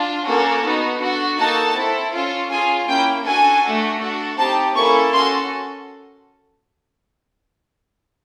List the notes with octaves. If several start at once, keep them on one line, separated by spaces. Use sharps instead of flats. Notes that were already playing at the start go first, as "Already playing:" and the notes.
Already playing: D4 F4
A#3 C#4 F#4 A4
B3 D#4 F#4
D4 F#4 A4
A#3 D#4 F#4 A4 A5
C4 E4 A4
C#4 F4 A4
C#4 F4 G#4 G#5
A#3 C#4 E4 G5
D4 F#4 A4 G#5
A3 D4 F#4 A4
D4 F#4 A4
C4 D#4 G4 A5
A#3 C#4 E4 A4 C#6
C#4 F#4 A4 C6